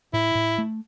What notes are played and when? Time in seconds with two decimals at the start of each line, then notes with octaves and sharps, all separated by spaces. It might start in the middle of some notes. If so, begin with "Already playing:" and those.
0.13 A2 E4
0.35 A2
0.58 A3